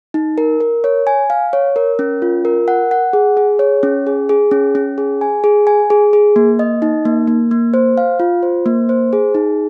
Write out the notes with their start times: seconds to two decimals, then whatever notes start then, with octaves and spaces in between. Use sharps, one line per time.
0.14 D#4
0.38 A#4
0.60 A#4
0.84 C#5
1.07 G#5
1.30 F5
1.53 C#5
1.76 A#4
1.99 C#4
2.22 F4
2.45 A#4
2.68 F#5
2.91 F#5
3.13 G#4
3.37 G#4
3.59 C#5
3.83 C#4
4.07 G#4
4.29 G#4
4.51 C#4
4.75 C#4
4.98 G#4
5.21 G#5
5.44 G#4
5.67 G#5
5.90 G#4
6.13 G#4
6.36 A#3
6.59 D#5
6.82 D#4
7.05 A#3
7.27 A#3
7.51 A#3
7.74 C5
7.98 F5
8.20 F4
8.43 C5
8.66 A#3
8.89 C5
9.13 G#4
9.34 D#4